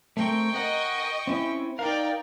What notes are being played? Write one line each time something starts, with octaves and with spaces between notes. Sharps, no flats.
A3 C4 A#4 G5 C#6
A#4 D#5 F#5
C4 C#4 E4
D#4 A#4 D5 F5 G5